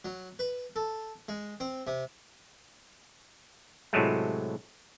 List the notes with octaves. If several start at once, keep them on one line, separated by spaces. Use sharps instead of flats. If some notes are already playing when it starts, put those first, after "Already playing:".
F#3
B4
A4
G#3
C4
C3
A2 C3 F#3 G#3 A3